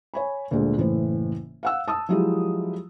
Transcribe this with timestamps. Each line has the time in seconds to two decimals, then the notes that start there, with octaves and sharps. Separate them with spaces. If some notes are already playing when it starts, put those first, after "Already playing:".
0.14 C#5 G#5 B5
0.51 D2 A#2 G#3
0.77 F#1 A2 E3 C5
1.63 F5 F#5 E6
1.88 A5 D#6 E6
2.09 F3 F#3 G#3 E4 F4 G4